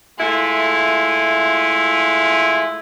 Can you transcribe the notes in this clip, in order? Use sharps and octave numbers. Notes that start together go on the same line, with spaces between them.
G#3 A3 E4 F4